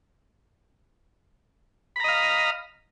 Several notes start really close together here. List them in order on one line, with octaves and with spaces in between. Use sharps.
B5 A#5 D#5 F5